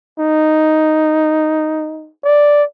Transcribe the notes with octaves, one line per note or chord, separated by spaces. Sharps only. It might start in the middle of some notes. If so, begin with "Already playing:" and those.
D#4
D5